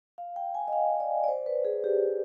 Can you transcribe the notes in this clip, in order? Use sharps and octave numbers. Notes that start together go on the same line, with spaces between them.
F5
G5
G#5
D#5
F5
D5
D5
C5
B4
G#4
G4